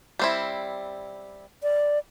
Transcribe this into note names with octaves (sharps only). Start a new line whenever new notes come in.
G3 C4 E4
D5